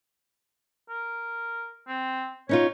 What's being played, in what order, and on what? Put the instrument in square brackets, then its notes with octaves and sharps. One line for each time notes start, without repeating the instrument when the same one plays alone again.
[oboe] A#4
C4
[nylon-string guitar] C#4 D#4 F4 [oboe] C#5